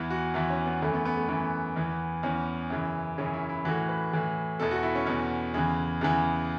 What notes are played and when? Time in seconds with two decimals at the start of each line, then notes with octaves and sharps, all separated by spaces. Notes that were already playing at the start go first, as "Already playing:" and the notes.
Already playing: E2 E3
0.10 F#4
0.34 E2 E3 E4
0.50 C#4
0.65 B3
0.82 F#2 E3 A3
0.94 B3
1.05 B3
1.18 A3
1.28 F#2 E3 B3
1.76 E2 E3
2.23 E2 E3 C#4
2.70 F#2 C#3 E3
3.18 F#2 C#3 E3 C#4
3.34 E4
3.49 E4
3.65 A2 E3 F#4
3.89 B4
4.13 A2 E3
4.60 E2 B2 A4
4.71 F#4
4.83 E4
4.95 C#4
5.07 E2 B2
5.54 E2 C#3 E3
6.01 E2 C#3 E3